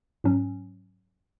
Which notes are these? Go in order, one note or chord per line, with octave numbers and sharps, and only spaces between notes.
G#2 F#3 C#4